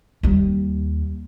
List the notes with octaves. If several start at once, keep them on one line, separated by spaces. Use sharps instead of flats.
D#2 G3